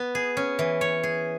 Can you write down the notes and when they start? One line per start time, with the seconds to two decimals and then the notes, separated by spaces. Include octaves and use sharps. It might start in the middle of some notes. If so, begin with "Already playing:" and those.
Already playing: B3
0.15 G#4
0.37 C#4
0.59 E3
0.81 C#5
1.03 G#4